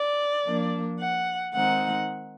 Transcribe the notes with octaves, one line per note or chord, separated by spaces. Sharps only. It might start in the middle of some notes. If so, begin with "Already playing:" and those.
Already playing: D5
F3 A#3 D4
F#5
D#3 G#3 C4 D#4 F#5